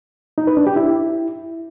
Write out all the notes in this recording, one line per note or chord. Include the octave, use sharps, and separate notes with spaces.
D#4
B4
D4
G4
E4